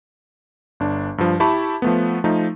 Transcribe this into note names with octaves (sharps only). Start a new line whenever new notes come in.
G1 D4
G2 F3
E4 G4 A5 B5 C#6
F3 A3 B3
F3 A3 D#4